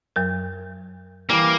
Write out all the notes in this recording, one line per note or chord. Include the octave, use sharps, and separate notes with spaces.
F#2 F#3 A#4
E3 G3 A#3